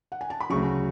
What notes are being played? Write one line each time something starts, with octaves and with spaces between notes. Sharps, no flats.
F#5
G#5
A5
B5
D2 C#3 F#3 C#6